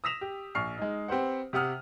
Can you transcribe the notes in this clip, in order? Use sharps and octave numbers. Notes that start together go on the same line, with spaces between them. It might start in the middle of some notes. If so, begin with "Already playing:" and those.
D#6 E6 A#6 B6 E7 F7
G4
A#1 C#6 F6 C7
G#3 D#4
C4 G4 B4 C5 F#5
C3 G4 F#5 D#6 F6